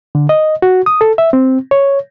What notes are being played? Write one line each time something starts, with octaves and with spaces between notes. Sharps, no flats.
D3
D#5
F#4
D#6
A4
E5
C4
C#5